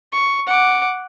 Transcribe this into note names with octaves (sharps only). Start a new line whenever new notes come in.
C#6
F#5 D6